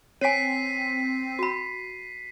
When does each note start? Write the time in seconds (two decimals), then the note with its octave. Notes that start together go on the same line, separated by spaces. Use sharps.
0.21 C4 C#5 G#5 B6 C7 D#7
1.39 F#4 B5